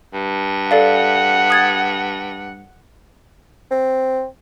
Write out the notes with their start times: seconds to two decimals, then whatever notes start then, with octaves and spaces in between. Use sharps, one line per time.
0.13 G2
0.71 A4 D5 F5 F#5
1.50 D#6 G#6 A6
3.71 C4